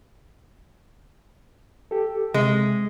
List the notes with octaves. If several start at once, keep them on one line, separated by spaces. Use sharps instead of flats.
G4 A4
C3 G#3